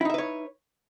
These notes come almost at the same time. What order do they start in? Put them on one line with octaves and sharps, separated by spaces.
E4 D#4 E5 B4 C#5